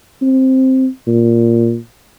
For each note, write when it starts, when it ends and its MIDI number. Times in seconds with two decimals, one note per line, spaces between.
0.22 0.87 60
1.07 1.76 46